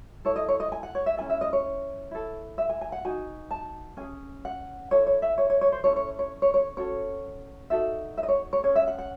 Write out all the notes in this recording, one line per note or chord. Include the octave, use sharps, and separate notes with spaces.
E4 A4 C#5
D#5
C#5
D#5
G#5
F#5
C#5
E5
C#4 E4 A4 G#5
E5
D#5
C#5
E4 A4
E5
G#5
G#5
F#5
D#4 F#4 G#5
A5
C#4 G#4 G#5
F#5
E4 A4 C#5
C#5
E5
C#5
C#5
C#5
C5
C#4 E4 A4 C#5
C#5
C#5
C#5
C#5
C#4 F#4 A4 C#5
D#4 F#4 A4 E5
E5
D#5
C#5
C#5
C#4 G#4 C#5
E5
F#5
F#5